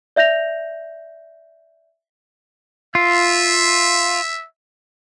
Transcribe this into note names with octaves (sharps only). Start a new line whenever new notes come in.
D5 E5 G6 A#6 F7
F4 E5